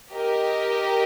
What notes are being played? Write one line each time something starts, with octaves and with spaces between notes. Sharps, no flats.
G4 A#4 D#5